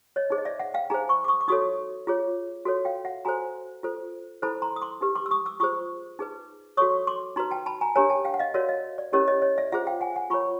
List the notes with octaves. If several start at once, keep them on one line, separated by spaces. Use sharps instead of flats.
C#5 D#5
D#4 G#4 C5
D#5
D5 E5
E5 F#5
F5 G5
D#4 G#4 C5 G#5 A#5
B5 C#6
D6
C#6 D#6
D6
D#4 F#4 A4 C#5 C#6 D#6
F4 G#4 C#5
F#4 A4 C#5
F5 G5
E5 F#5
F#4 A4 C5 G#5 A#5
F4 A4 C5
E4 A4 C5 A5 B5
A#5 C6
D#6
C6 D6
D#4 G4 B4
C6 D6
E6
C#6 D#6
D6 E6
F4 G#4 C5 C#6 D#6
D#4 G#4 B4
F#4 A4 C#5 C#6 D#6
C6 D6
D#4 F#4 B4 A#5 C6
G5 A5
A5 B5
G#5 A#5
D4 G4 A#4 C#5 G#5 A#5
G5 A5
F5 G5
F#5
D#5 F5
F#4 A#4 C#5 D5 E5
D#5 F5
D5
C#4 E4 G4 A#4 C#5 D#5
C#5 D#5
C#5 D#5
D5 E5
F4 G#4 C5 E5 F#5
F5 G5
F#5 G#5
F#5 G#5
F4 A#4 C#5 B5 C#6